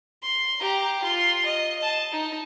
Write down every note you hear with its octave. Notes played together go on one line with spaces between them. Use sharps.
C6
G4 A#5
F4 C6
D#5
D#5 A5
D#4